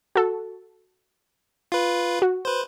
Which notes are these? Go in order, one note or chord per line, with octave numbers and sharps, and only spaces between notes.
F#4 A4
F4 B4
F#4
B4 C5